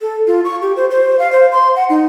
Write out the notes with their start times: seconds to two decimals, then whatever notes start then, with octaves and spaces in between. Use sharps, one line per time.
0.01 A4
0.27 F4
0.45 C#6
0.62 G4
0.76 C5
0.91 C5
1.19 F5
1.32 C5
1.52 C6
1.76 F#5
1.90 D#4